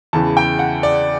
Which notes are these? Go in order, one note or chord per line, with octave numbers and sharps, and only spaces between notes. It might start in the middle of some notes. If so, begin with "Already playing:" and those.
E2 C#3 E3 A5
G5
F#5
D5